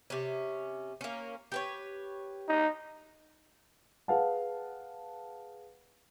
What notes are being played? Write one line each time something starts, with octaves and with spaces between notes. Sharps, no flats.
C3 C#4
A#3 C#4
G4 B4 C#5
D#4
G#4 B4 F5 F#5 A5